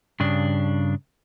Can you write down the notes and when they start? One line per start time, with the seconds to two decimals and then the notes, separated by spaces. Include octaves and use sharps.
0.20 G2 C#3 D4